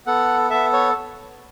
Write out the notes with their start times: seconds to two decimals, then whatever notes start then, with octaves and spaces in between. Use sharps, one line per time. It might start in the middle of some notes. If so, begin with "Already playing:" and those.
0.07 B3 A4 F#5
0.50 B3 A4 E5
0.73 C#5